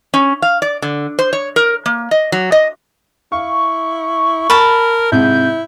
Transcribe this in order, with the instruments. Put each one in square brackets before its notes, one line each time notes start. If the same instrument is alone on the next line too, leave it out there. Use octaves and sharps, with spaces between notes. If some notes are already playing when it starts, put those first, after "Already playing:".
[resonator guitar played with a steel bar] C#4
F5
D5
D3
C5
C#5
A#4
A#3
D#5
F#3
D#5
[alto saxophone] E4 [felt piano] F5 [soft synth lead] C#6
[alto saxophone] A#4 [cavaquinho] A5 B5 [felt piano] A6
[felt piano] G#2 C3 [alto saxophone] E4 [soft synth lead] G6